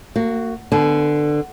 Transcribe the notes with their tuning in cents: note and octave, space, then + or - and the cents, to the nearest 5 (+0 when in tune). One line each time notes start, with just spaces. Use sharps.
A#3 -30 F#4 +10
D3 +20 B3 +25 A5 -40